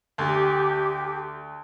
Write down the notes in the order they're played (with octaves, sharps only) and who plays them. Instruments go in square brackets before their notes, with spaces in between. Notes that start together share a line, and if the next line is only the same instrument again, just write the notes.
[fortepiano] D2 [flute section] G4